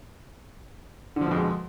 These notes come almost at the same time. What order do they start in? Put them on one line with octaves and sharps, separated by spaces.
D3 F3 B2 F2 G#3